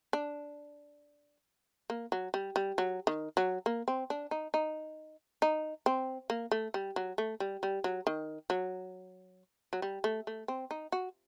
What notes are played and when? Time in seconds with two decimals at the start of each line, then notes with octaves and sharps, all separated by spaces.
0.13 D4
1.90 A#3
2.12 F#3
2.34 G3
2.56 G3
2.78 F#3
3.07 D#3
3.37 F#3
3.66 A#3
3.88 C4
4.10 D4
4.31 D#4
4.54 D#4
5.42 D#4
5.86 C4
6.30 A#3
6.51 A3
6.74 G3
6.96 F#3
7.18 A3
7.40 G3
7.63 G3
7.84 F#3
8.07 D#3
8.50 F#3
9.73 F#3
9.82 G3
10.04 A3
10.27 A3
10.48 C4
10.71 D#4
10.92 F#4